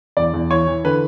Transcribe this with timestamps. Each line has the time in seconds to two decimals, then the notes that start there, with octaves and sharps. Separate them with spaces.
0.17 E2 D5
0.33 E2
0.50 E3 C#5
0.67 E3
0.84 D3 B4